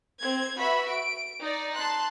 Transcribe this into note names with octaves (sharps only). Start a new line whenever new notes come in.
C4 G#6
F#4 B4 E5 B5
D7
D#4 D5
A5 C6 F#6